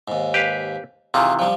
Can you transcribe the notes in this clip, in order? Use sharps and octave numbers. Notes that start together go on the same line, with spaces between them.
D#2 G#2
G4 B4 F5
C3 D#3 E3 F4 G#4
F3 G3